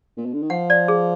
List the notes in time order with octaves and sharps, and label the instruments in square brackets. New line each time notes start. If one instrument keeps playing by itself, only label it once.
[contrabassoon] A#2
B2
D3
D#3
[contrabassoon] F3 [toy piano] F#5
[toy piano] D5
G#4